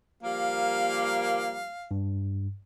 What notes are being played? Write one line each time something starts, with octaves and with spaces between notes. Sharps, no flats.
F3 G3 A#3 F5
G2